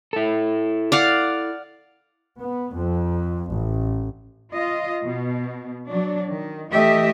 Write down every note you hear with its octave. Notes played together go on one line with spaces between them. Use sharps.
E4 A4
D5 F5 F#5
B3
F2
A1
F4 D#5
B2
F#3 D4
D#3
E3 A3 G4 D#5 E5